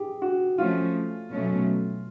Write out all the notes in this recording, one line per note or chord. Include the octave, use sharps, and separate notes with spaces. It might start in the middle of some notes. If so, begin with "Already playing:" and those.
Already playing: G4 G#4
F#4
F3 A3 C#4 F4
B2 F#3 A3 C#4